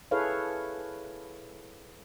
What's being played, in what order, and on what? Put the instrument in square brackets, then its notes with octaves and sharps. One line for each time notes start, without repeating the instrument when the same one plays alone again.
[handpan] E4 G#4 A4 B4 C#5 F5